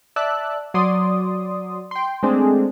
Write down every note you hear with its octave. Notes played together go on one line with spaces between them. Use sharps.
D5 E5 A5 E6 F#6
F#3 D5 C6 D#6
G5 C6
G#3 A3 C4 D4 G#4